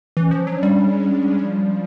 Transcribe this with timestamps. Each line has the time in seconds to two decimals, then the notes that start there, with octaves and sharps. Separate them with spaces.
0.17 E3 C#4
0.31 F3
0.46 F#3 D4
0.63 G3
0.78 G#3
1.39 F3